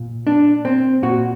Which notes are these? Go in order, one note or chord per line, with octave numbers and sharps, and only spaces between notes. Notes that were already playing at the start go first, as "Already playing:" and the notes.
Already playing: A#2
D4
C4
A#2 F#4